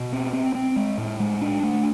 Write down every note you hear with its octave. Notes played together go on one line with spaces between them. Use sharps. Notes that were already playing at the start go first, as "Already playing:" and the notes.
Already playing: B2
C4
C4
C4
G#3
A2
G#3
D4
A3